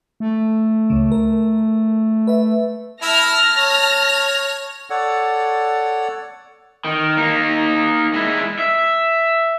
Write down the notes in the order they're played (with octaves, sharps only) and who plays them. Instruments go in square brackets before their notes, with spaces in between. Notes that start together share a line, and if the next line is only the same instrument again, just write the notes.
[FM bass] A3
[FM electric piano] C#2 C#3
A#4
B4 E5
[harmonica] E4 E5 [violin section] A5 F6 A#6
[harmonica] C#5
[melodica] A4 C#5 D5 F#5
[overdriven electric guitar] D#3
A#3 D#4
G#3 E4
E5